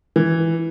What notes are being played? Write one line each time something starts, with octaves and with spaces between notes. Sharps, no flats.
E3